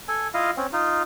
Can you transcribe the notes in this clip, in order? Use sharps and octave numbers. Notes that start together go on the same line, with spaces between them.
A4 G#5
E4 F4 D#5 F5
C4 C#4
D#4 F4